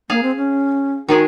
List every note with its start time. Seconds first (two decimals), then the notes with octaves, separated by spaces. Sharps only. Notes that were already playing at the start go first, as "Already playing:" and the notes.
0.10 A#3 G#4 F5
0.23 C4
0.37 C#4
1.09 D#3 G#3 F#4 G#4